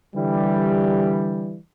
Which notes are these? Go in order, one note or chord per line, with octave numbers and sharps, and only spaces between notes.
D3 E3 G3